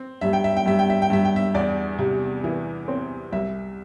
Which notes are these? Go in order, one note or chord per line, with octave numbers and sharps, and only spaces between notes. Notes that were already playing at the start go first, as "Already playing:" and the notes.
Already playing: C4
G2 E5
G5
E5
G5
G2 E5
G5
E5
G5
G2 E5
G5
E5
E2 D5
C3
E3
C4
C2 E5